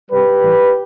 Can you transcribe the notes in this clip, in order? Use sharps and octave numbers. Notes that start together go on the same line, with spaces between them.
C3 G3 G4 B4
A2 E3 G3